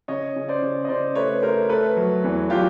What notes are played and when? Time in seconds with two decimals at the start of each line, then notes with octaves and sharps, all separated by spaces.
0.08 C#3 C#5 D#5
0.36 C#3
0.48 C5 D5
0.62 C#3
0.85 D#5
0.89 C#3 C5 D5
1.15 A3 B4 C#5
1.42 A3 A#4 C5
1.69 A3 A4 B4
1.96 F#3
2.24 E2
2.50 F#3 F4 G4